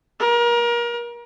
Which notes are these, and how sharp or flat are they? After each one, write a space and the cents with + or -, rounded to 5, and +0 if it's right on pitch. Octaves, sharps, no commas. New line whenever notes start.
A#4 +30